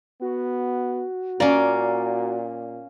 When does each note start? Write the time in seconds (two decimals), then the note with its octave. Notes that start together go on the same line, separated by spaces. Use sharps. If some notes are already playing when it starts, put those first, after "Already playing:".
0.22 B3 F#4
1.40 A#2 A#3 C#4 D5